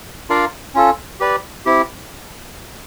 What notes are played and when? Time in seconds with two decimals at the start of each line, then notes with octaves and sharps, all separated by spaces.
0.29 D4 F4 A#4 D5 F5
0.74 C#4 F4 A4
1.20 G4 B4 D5
1.66 C4 E4 G4